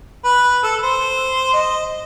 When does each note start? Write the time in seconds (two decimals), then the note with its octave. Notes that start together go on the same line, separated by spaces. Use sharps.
0.25 B4
0.63 A4
0.83 C5
1.53 D#5